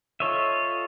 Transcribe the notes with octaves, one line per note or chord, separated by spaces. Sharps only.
F4 A4 C#5 D#5 E5